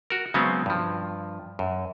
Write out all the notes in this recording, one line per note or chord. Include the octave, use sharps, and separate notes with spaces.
F#4 A#4
C#3 F#3 G#3 B3 C4
G2 F3
F#2